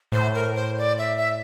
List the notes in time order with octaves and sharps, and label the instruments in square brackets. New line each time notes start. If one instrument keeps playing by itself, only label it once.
[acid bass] A2 [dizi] C5
[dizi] A#4
C5
D5
E5
E5